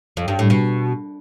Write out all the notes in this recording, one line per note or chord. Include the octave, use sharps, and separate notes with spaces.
F2
G2
A2
B2